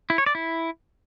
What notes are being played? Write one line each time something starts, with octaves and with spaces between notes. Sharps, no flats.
E4
C#5
D5
E4